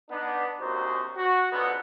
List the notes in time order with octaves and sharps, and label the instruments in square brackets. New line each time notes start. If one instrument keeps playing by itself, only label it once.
[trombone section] B3 D4 D#4
A#1 F#2 C3 D#4 F#4 C5
F#4
C#2 G#2 D3 B3